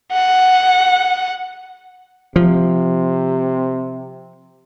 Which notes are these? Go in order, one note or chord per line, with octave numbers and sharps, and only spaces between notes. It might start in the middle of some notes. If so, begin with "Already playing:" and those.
F#5
C3 F3